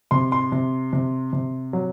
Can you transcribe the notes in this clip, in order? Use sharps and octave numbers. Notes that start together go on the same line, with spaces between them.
C3 C6
C6
C3
C3
C3
F#3